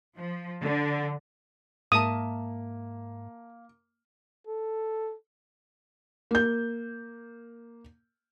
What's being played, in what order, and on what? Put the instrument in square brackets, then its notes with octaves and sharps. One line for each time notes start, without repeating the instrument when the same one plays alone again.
[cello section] F3
D3
[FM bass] G#2 [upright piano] A#3 [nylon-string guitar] A#4 E5 A5 [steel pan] D#6
[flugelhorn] A4
[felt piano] A#3 G6